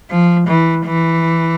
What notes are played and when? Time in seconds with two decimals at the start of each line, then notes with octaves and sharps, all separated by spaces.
0.10 F3
0.48 E3
0.86 E3